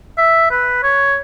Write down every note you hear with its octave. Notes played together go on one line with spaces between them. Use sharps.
E5
B4
C#5